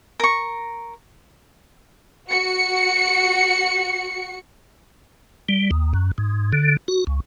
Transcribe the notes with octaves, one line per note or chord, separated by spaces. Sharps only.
A#4 C#6
F#4 C#7
G3
D#2
F#2
G#2
D3
F#4
C#2